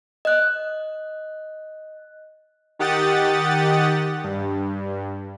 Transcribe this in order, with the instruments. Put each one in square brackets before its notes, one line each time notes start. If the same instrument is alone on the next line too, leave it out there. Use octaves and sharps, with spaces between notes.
[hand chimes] D#5 F#6
[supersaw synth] D#3 G4 F#5 D#6 A6
G2